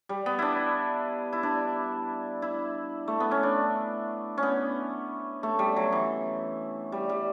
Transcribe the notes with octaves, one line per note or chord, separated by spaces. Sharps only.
G3
B3
D4 E4
E4
D4
E4
A3
B3
C#4
D4
C#4
B3
A3
G3
F#3
E3
G3
G3